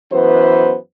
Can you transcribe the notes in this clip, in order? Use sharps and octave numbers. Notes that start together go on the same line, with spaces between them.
F#2 E3 B3 B4 C5